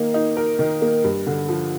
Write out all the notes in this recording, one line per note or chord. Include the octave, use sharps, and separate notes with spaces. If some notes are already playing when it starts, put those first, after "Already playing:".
Already playing: D#3 A#3
D#4
A#4
D#3
A#3
G2
D3
F3